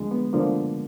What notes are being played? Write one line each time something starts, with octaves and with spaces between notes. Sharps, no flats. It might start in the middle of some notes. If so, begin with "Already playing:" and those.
Already playing: D2 D3 F3 G#3
B3
D2 D3 F3 A#3